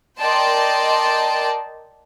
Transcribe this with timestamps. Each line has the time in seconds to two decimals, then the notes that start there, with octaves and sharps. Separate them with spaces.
0.20 A#4 D5 D#5 G5 A5 C6